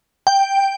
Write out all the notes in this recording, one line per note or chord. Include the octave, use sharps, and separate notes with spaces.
G5